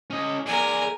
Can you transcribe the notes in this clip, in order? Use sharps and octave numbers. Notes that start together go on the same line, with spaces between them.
C#4 D#5
G#4 A#4 D5 G#5